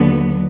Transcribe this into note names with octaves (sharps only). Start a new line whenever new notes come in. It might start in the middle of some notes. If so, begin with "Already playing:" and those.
Already playing: D#2 D3 F#3 B3